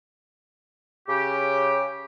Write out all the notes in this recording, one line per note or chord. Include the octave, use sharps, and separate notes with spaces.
C#3 G4